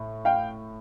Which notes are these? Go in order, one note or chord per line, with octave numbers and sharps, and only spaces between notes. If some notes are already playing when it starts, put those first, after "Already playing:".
Already playing: A2
F5 G5